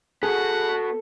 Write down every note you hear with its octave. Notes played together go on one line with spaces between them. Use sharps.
B3 F#4 G#4 A4 F#5